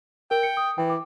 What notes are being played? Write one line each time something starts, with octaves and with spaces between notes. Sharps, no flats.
A#4 G5
C#7
D#6
E3 G5
D6